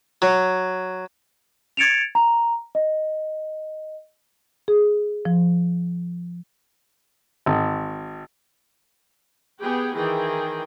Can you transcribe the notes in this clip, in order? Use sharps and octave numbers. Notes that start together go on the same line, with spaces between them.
F#3
G#6 A6 C#7 D7 E7 F7
A#5
D#5
G#4
F3
G#1
B3 G4 G#4 G5
D#3 E3 G#4 G5